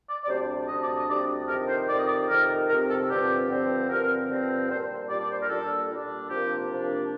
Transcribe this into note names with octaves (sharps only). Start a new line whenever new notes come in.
D5
D5
D2 C3 G3 D4 C5
D2 C3 G3 D4 D#5
D5
D#5
D#5
D2 C3 G3 D4 D5
F2 C3 D#3 A#4
C5
F2 C3 D#3 D5
D#5
D5
F2 C3 D#3 A#4
F2 C3 D#3 A#4
A4
G2 D3 F3 C4 G4
G2 D3 F3 C4
G2 D3 F3 C4 A#4
G2 D3 F3 C4
A#2 G3 D4 C5
A#2 G3 D4 D5
D5
C5
A#4
A#2 G3 D4 A4
A#2 G3 D4
C3 F3 A#3 D4 G4
C3 F3 A#3 D4